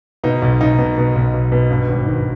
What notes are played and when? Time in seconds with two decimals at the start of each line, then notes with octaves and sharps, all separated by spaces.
0.24 B2 D#4
0.42 B1
0.61 B1 D#4
0.78 B2
0.97 B2
1.16 B1
1.34 B1
1.52 B2
1.71 G2
1.88 G#1
2.06 D#3